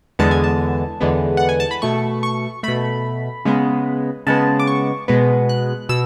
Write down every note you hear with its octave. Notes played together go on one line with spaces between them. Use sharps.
E2 D3 G#3 B3 A5
G#5
A5
E2 D3 G#3 B3
F#5
G#5
A5
B5
B2 A3 C#6
C#6
B2 A3 B5
C#3 G#3 B3
C#3 G#3 B3 A5
D6
C#6
B2 G#3 B3
F#6
B2 E6